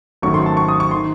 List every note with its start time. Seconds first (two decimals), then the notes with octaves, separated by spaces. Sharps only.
0.22 G#1 F#2 D#3 F#3 A3 C#6
0.34 C6
0.46 A5
0.57 C#6
0.68 D#6
0.80 C#6
0.91 D#3 C6